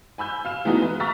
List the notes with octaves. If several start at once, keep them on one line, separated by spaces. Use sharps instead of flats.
G#5 B5 E6 G6
F5 F6 E7
E3 G#3 A3 B3 D#4 F#4
B4
A#5 C#6 E6 F6 A6 B6